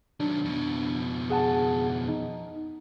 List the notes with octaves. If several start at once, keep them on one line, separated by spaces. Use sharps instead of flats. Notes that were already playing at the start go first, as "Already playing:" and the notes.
D#3 F#3 D4
F2 B2
G#4 F#5 A5
D#4